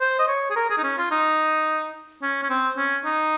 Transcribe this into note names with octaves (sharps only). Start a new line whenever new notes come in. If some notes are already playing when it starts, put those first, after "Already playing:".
C5
D#5
C#5
G#4
A#4
G#4
D#4
C#4
F4
D#4
C#4
C#4
C4
C#4
D#4